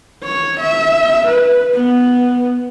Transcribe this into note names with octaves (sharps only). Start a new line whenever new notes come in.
C#5
E5
B4
B3